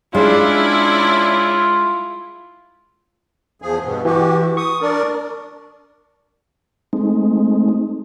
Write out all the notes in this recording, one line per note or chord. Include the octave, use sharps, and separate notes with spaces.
G#3 C#4 D4 E4 F4
E2 F3 G#4
G2 B2 B3
E3 F#4 G4
C#6 D#6
D4 A#4 D5
G#3 A3 C4 D#4